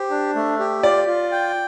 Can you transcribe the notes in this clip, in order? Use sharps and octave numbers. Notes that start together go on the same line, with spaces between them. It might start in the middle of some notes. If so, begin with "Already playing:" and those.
Already playing: G4 C5
D4
A3
G4
F4 D5
F4
G5